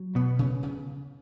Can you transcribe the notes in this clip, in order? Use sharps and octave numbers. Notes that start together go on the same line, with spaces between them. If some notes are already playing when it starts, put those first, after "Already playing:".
Already playing: F#3
B2 B3
C#3
C#3